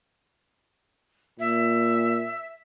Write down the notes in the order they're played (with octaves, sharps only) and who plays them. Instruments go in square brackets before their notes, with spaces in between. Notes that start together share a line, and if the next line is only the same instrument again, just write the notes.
[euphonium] A#2 [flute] E5